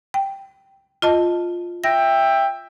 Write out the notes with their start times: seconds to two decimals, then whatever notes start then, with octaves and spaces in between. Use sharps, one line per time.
0.14 G5
1.02 F4 D#5 A5
1.84 E5 G5 A#6